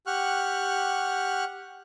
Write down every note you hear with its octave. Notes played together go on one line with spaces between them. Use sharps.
G4 F#5 C#6 F6 F#6